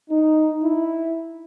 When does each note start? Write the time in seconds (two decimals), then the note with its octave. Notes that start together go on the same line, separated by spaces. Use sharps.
0.10 D#4
0.63 E4